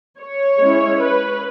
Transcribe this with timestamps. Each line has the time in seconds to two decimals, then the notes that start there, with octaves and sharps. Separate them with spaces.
0.19 C#5
0.60 G#3 C#4 E4
1.01 B4